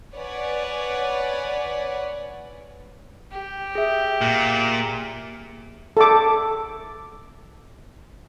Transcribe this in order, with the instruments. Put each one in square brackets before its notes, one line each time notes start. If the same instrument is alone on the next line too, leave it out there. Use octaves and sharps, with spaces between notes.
[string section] B4 C#5 D5 F#5 G#5
[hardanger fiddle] G4
[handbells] G#4 E5
[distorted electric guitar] A#2
[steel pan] A4 D6